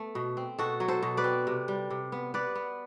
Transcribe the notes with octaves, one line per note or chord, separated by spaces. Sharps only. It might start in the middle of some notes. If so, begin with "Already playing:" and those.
Already playing: A3 B3
B2
C4
B2 F#4 A4
F#3
A4 C5
B2
B4 D5
C4
C3
G3
C3
B3
B3 B4 D5
B3